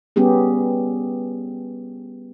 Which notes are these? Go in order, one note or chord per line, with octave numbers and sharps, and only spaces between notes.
G3 B3 C#4 G4 G#4